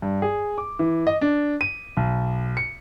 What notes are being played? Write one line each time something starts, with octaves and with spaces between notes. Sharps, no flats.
G2
G#4
D6
E3
D#5
D4
D#7
B1
C#7